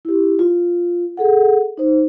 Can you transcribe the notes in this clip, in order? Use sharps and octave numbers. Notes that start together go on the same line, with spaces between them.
E4 G4
F4
G#4 A4 F#5
D#4 C5